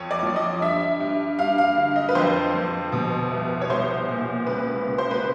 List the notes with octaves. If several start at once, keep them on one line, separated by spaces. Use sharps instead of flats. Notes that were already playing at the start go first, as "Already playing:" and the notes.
Already playing: F2 C#5
D5
F3
D#5
G2 E5
G2
G2 F5
F5
D3
D#5
B4
F2 C5
F2
B2
C2
C#5
C2 C5
A#2
C#2 B4
C#2
C5
B4